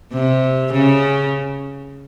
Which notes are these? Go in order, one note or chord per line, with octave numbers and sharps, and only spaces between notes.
C3
C#3